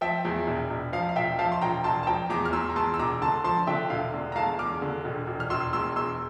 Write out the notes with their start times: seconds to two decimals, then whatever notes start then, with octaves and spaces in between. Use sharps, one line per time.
0.01 F3 E5 G5
0.25 E2
0.47 E1
0.70 E1
0.93 F3 F5
1.09 F5
1.16 E1 E5 G5
1.39 F3 F5 A5
1.52 C6
1.61 E1 G5 A#5
1.84 E1 A5 C6
2.03 A5
2.07 F3 G5 A#5
2.30 E2 A#5 D6
2.46 F6
2.53 E2 C6 E6
2.70 A#5
2.76 E2 A5 C6
2.94 E6
2.99 E1 A#5 D6
3.22 D3 A5 C6
3.44 F3 A5 C6
3.67 D3 E5 G5
3.90 E1 F5
4.14 D3
4.32 A#5
4.36 E2 F5 A5
4.59 E2 D6 F6
4.82 D3
5.05 E1
5.27 E1
5.40 F6
5.50 E1 C6 E6
5.73 E2 C6 E6
5.96 E1 C6 E6